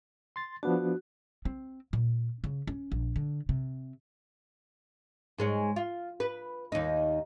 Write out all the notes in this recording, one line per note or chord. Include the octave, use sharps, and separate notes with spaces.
C6 A6
F3 B3 D4 F#4
C4
A#2
C#3
C#4
A#1
D3
C3
G#2 G#3 C#5
F4
B4
D#2 D#4